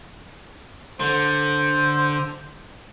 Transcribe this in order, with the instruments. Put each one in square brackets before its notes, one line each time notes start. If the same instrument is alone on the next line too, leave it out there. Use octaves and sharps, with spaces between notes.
[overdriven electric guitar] D3 [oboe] C5